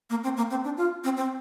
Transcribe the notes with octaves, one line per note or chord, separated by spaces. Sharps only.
A#3
C4
A#3
C4
D4
F4
C4
C4